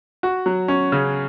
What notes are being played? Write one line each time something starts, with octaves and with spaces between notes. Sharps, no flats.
F#4
F#3
C#4
C#3